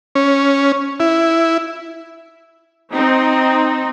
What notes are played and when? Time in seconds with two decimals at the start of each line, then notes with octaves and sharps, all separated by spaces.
0.15 C#4
1.00 E4
2.94 C4 D#4